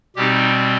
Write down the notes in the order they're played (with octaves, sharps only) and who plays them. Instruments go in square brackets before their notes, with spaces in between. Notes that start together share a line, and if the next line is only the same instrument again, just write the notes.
[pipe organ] B2 G3 C4 D#4 G4